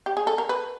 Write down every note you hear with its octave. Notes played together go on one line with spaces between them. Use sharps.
G4
G#4
A4
A#4
B4